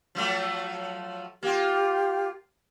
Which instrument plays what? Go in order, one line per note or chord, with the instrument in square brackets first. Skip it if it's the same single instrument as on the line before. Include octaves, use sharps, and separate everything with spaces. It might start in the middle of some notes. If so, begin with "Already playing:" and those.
[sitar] F3 F#3 A3
[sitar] A#3 F4 [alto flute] G4